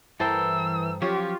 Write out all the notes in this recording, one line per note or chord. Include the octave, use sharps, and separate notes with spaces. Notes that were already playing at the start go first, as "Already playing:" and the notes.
G2 E3 A4 A#4 C5 G5 E6
F3 F#3 C#4 F4 G4 C#5